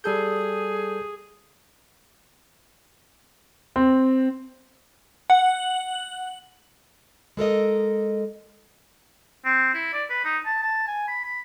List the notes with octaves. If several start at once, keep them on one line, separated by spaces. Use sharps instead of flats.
G3 G#4 A4 G6
C4
F#5
G#3 A4 A#4 D#5
C4
E4
D5
B4
D#4
A5
A5
G#5
B5
B5